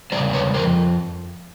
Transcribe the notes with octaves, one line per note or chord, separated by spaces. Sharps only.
C#3 E3 G3 C5 D5
B4 C#5
F2 A#4 C5